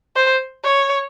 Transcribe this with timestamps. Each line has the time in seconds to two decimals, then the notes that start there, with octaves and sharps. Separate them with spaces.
0.16 C5
0.64 C#5